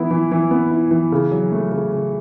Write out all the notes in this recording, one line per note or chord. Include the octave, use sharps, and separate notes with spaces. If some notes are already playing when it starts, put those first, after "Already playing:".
Already playing: E3 B3 E4
E3
E3
B3
E4
E3
C#3
F#3
A3
C#3
C#3